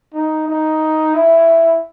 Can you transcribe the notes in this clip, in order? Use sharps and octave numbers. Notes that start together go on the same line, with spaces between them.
D#4
D#4
E4